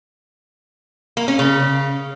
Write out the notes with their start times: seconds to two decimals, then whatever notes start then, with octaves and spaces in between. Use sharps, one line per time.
1.17 A#3
1.28 C#4
1.39 C#3